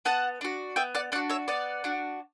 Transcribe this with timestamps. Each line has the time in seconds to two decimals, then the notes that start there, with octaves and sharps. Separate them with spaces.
0.05 B3 F#5 A5
0.41 D4 F#4
0.76 B3 E5 G5
0.95 D5 F#5
1.12 D4 D5 F#5
1.15 F#4
1.29 C#5 E5
1.48 B3 D5 F#5
1.84 D4 F#4